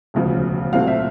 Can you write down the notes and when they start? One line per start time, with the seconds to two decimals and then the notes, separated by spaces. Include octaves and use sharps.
0.14 E1 D2 C#3 F3
0.73 C2 A#2 F#3 A3 C4 F5
0.88 E5